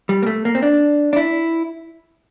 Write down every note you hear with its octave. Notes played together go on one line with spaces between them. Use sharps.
G3
A#3
A3
A#3
C4
D4
D4
E4